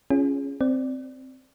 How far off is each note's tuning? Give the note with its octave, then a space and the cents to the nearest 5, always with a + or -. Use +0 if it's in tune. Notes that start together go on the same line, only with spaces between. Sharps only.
C#4 +0 F4 -20 G#4 +0
C4 +0 D5 +0